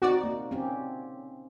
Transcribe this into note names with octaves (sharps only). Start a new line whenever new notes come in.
C4 D#4 F#4 D5
A#3
C4 C#4 G4